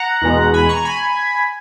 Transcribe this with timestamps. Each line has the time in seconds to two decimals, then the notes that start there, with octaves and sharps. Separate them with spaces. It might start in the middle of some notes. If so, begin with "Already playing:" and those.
Already playing: F#5 A#5
0.22 E2 B2 G#3
0.54 G#5 B5
0.69 A#5 C#6
0.85 G#5 B5